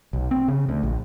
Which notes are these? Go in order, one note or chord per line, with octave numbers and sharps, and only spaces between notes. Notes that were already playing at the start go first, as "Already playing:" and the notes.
B1
C4
C#3
D2
A#1